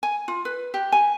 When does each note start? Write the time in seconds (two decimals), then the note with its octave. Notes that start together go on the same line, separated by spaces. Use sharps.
0.03 G#5
0.28 F4
0.45 B4
0.74 G4
0.92 G#5